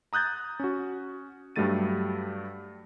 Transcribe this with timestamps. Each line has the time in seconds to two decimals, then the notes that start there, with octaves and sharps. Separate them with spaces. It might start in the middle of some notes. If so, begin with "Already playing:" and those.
0.13 A#5 D#6 F#6 G6 A6
0.60 C#4 F#4
1.56 G2 F#3 G3 A3 A6 D#7